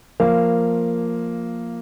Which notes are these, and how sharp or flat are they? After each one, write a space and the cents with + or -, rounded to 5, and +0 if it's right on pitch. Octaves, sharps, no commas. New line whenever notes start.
F3 +5 A#3 +0 F5 -15